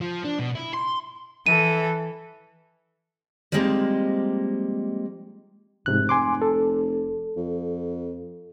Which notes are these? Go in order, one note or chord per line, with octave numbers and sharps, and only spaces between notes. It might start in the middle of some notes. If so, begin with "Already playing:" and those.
F3
D4
B2
E4
C6
E3 A4 D#7
F3 G3 G#3 A#3 C4 D#4
F1 G#2 C3 F#6
G#5 C6 D6
A4
F2